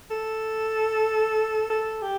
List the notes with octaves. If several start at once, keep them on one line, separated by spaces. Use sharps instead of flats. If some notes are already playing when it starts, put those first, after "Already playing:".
A4
A4
G4